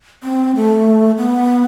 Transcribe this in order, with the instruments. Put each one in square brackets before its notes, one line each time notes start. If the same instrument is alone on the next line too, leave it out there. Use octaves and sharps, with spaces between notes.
[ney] C4
A3
B3